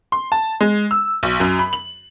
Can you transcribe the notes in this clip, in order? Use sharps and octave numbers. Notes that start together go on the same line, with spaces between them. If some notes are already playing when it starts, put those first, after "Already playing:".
C6
A5
G#3
E6
B1
F#2
B5
F#7